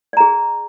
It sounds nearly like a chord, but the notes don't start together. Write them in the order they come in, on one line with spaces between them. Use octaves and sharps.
D5 A#5 G#4